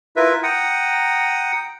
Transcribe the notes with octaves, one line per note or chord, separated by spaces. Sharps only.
E4 F4 A#4 B4 E5
F#5 G5 A#5 D#6